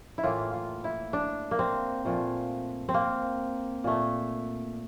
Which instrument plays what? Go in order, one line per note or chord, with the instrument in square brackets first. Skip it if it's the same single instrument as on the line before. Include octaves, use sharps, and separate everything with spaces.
[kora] E4
A2 E3 A#3 F4
F4
E4
D4
A#3
C4
A#2 F3 A3
C4
A#3
A#2 A3